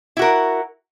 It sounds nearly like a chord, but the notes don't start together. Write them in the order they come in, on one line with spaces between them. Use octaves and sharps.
E4 F#4 A#4